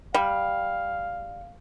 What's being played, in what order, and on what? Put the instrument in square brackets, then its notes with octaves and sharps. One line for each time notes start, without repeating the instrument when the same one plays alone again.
[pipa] G3 [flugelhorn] F5